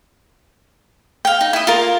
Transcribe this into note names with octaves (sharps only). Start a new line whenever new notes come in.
F5 G5
D#4
E4 D#5
F4 A#4